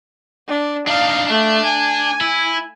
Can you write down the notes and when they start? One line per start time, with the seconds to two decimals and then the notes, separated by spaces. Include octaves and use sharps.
0.48 D4
0.87 D4 D#4 F5
1.28 A3 D4
1.65 G#5
2.21 E4